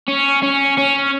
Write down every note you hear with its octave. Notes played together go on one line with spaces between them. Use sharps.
C#4
C#4
C#4